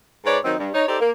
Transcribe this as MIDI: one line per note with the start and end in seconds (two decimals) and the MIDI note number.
0.25 0.38 44
0.25 0.38 71
0.25 0.38 73
0.25 0.38 74
0.44 0.55 51
0.44 0.55 54
0.44 0.55 60
0.44 0.55 63
0.58 0.69 43
0.74 0.85 63
0.74 0.85 73
0.87 0.98 63
0.87 0.98 67
0.87 0.98 69
0.87 0.98 72
0.87 0.98 74
1.00 1.11 58